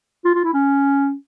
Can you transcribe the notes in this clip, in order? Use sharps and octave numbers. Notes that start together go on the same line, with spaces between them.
F4
F4
E4
C#4